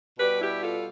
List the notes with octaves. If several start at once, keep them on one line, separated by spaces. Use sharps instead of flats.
B2 G3 G4 B4
E4 G4
F4 A4